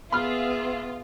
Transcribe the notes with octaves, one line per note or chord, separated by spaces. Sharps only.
B3 F4 G#4 E5 B5 F6